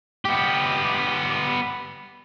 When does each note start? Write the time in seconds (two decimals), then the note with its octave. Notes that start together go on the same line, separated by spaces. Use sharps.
0.25 B3 G4